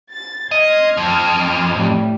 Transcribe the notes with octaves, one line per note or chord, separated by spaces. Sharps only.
A6
D#5 C6 F6 G#6
F2
A2 G3